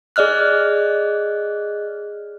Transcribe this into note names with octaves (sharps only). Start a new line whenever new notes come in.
G#4 D5 D#5 F6 F#6